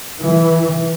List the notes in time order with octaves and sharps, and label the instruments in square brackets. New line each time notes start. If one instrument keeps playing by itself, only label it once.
[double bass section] E3